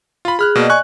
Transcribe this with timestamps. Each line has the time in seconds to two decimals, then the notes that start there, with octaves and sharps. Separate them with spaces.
0.25 F4 B5
0.39 G#4 B5 F6 F#6
0.55 B2 A#3 D5 D#5
0.70 G#5 C#6 F#6